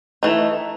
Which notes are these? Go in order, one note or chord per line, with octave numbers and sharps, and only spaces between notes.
E3 A3 D#4